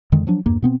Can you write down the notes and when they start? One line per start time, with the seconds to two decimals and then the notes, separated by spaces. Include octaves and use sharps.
0.12 F2 D3 D#3 G#3
0.27 F3 F#3 D4
0.46 E2 G2 A#3
0.62 B2 B3 C4